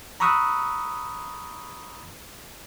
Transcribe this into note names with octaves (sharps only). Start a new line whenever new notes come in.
A#5 B5 C#6 D#6 E6 F#6